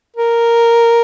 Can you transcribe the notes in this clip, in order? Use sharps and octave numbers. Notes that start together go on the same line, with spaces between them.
A#4